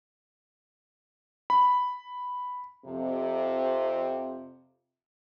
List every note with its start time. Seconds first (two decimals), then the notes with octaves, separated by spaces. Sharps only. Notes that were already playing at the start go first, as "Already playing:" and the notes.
1.50 B5
2.86 F2 C3